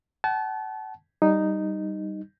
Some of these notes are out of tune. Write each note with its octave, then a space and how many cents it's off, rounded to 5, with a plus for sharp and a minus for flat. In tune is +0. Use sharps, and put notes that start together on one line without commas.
F#5 +40 A5 -30
G3 -10 D#4 -5